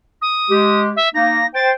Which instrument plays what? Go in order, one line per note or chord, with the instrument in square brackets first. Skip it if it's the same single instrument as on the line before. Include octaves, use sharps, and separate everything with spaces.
[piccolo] D#6
[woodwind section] G#3 G4
[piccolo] E5
[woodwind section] A#3 D#4 [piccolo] A#6
[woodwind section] C5 G5 [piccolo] A6